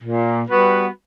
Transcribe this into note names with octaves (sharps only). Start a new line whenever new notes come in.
A#2
G3 B3 F#4 B4